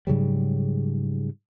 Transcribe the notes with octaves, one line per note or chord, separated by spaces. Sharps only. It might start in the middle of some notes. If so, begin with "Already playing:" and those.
G#2 C#3 F#3 G3